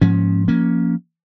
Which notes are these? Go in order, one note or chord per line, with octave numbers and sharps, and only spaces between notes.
G#2 F3 A#3 C#4
F3 A#3 C#4